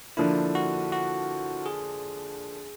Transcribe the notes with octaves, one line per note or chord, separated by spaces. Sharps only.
D3 F3 A#3 D4 E4
F#4
F#4
G#4